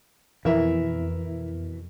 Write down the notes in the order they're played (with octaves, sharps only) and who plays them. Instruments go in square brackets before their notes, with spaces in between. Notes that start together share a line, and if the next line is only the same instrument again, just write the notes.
[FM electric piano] F2 B2 [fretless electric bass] E3 [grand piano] E4 [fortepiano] A#4 E5